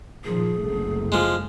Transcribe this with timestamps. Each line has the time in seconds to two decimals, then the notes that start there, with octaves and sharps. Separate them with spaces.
0.25 A#2 D#3 F3 G#4
0.59 F#1 C2 A3
1.12 F3 G#3